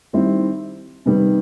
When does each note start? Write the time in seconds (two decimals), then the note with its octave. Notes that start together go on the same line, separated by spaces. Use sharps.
0.13 D#3 G3 C4 E4
1.06 C3 D#3 G3 B3